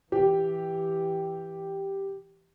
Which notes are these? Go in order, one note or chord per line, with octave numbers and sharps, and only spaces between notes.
E3 G4